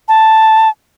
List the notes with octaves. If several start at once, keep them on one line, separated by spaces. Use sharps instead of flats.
A5